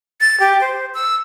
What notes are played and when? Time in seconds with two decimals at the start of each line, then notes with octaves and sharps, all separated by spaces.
0.21 A6
0.40 G4
0.61 C5
0.94 E6